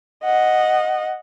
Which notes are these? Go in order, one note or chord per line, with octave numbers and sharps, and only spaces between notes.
D#5 F#5